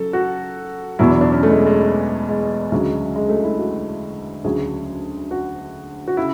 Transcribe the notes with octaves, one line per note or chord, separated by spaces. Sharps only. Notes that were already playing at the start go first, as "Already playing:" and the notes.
Already playing: C#3 F#3 A4
F#4
E2 B2 F#3 E4
D4
D4
C#4
A3
G#3
G#3
G#3
D2 C#3 F#3 G#3
G#3
A3
E4
F#4
D2 C#3 F#3 G#4
F#4
F#4
C#3 E4